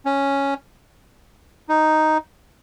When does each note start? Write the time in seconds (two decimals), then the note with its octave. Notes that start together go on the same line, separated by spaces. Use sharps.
0.06 C#4
1.69 D#4